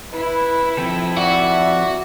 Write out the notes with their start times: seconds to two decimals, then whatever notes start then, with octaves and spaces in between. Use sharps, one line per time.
0.13 E4 B4
0.77 F3 C4 A4
1.18 F#4 D5 E5